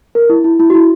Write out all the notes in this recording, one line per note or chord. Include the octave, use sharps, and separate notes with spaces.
A#4
E4
E4
E4
F#4
E4